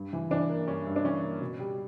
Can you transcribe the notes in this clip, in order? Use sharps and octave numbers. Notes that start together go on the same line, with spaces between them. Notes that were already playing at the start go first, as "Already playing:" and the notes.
Already playing: G2
E3
E3 D4
A#3
G2 C#4
G2
D4
E3 C#4
A#3
B2
G3